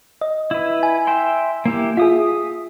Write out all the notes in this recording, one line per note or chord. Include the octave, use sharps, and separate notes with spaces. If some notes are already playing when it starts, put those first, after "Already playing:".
D#5
E4 B4
G#5
E5 G5 C6
A#3 E4 G4
F4 G#4 E5 D#6